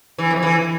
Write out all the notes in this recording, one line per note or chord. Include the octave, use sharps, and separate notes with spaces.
E3
F2
E3